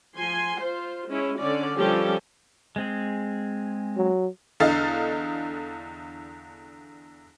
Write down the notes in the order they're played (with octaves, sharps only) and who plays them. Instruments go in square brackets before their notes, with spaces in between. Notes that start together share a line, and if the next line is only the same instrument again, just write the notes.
[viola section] F3 G#5 C6
F4 C5
G#3 C#4 E4
D3 C#4 D5
F3 G3 A#3 C#4 G4 A4
[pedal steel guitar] G#3 C4 G#4
[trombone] F#3
[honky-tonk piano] E2 D3 A4 D#5 F5 A6